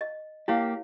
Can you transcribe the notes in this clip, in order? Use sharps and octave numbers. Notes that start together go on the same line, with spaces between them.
D#5
A#3 E4 G4 C#5 F5